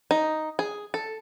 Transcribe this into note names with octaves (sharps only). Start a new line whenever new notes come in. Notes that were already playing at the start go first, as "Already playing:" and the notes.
D#4
G#4
A4